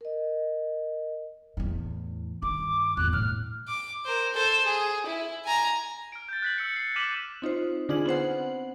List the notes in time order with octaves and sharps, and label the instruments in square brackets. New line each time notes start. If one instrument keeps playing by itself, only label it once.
[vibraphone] A#4 D#5
[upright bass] E2 A2
[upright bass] G2 D#3 [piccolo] D6
[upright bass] A1 E2 [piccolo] F#6
[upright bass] A2 [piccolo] F6
[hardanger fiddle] D6
A#4 C5
A4 C5
G#4
E4
G#5 A#5
[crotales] F6 D7
G6 A6
F#6 B6 F#7
E6 C#7
C7 C#7
D6 F6 B6 D#7 E7 F#7
[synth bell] C4 D#4 F4 C5
D3 D4 D#4 F4 G#4 F#7
B3 C4 C5 F#5